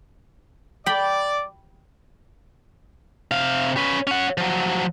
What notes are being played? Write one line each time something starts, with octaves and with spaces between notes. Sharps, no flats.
D5 G5 B5
C3 F5
C#4 B4
C#4 F#5
F3 F#3